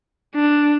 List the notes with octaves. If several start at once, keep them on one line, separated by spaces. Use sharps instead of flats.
D4